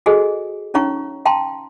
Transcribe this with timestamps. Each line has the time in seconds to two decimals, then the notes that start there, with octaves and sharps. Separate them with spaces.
0.06 F#4 G#4 A4 C5 D#5 G#5
0.74 C#4 D#4 C#5 F5 A#5 C#6
1.25 F5 G5 A5 A#5 C6